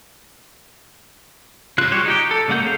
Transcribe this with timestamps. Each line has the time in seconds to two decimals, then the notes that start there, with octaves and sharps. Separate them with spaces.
1.78 C#3 F4 F#6
1.91 F#3 G3 F#4 G4 C#5
2.06 D#4 G4 G5
2.31 A4
2.48 C#3 G#3 A#3 F#5 G6
2.63 A3 C#4 F5